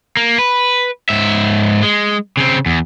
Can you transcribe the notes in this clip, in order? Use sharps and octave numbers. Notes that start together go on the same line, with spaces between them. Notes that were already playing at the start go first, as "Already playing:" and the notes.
A#3
B4
G#2 E5
G#3
C#3 C4
E2